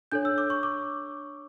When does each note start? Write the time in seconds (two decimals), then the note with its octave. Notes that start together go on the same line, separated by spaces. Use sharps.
0.12 D4 A4 C#5 G6
0.25 E6
0.38 D6
0.50 C#6
0.63 D6